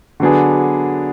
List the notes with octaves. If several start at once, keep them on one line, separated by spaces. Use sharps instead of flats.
D3 F#3 B3 D4 G#4